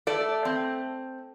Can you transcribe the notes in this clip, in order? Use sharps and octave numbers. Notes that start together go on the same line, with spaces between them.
A3 D5
C4